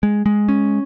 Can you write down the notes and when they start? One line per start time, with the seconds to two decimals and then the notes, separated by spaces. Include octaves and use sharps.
0.03 G#3
0.26 G#3
0.49 C#4